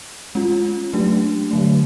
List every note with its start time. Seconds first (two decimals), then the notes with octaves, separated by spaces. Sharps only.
0.35 G#3 C#4 F4
0.93 F#3 A3 D4 G4
1.51 D3 F#3 A3